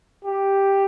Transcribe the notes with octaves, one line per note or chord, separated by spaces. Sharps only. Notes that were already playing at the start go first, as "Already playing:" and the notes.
G4